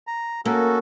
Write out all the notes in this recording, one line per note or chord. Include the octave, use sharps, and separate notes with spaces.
A#5
A#3 C#4 F#4 A4